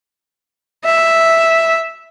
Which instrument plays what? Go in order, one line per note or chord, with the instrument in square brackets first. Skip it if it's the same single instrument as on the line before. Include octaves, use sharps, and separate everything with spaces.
[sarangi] E5